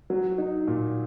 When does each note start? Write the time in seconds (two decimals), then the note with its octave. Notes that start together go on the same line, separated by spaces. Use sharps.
0.10 F#3
0.38 D#4
0.67 A#2